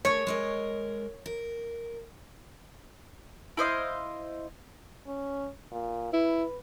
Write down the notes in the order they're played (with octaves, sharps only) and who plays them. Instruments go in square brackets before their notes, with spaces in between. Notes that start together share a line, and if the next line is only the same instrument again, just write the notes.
[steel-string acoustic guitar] A3 G#4 A#4 [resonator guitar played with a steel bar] C#5
[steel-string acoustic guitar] G#3 A#4 D#5
A#4
[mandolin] E4 C5 D#5 F5
[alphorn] C#4
A#2
[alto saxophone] E4 [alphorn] B4